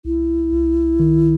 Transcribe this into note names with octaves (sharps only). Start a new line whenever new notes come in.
C2 E4
C2
D#3